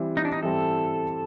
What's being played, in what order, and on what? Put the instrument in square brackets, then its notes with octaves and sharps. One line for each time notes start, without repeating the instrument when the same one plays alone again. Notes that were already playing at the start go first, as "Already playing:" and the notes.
Already playing: [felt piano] E3 G3 C4
[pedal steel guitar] D#4
D4
D#4
[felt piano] E3 G3 C4 [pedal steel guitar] A4